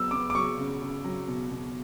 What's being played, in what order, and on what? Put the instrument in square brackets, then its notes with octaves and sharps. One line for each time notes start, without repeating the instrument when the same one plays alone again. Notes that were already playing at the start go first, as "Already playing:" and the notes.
Already playing: [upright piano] F#3 B3 [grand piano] E6
[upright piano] B3 [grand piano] D6
[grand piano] D6
[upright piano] F#3 [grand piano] C#6
[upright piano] C#3
C#3
F#3
B2
B2